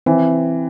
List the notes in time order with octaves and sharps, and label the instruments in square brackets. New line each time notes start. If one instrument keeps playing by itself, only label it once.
[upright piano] E3 [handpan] C4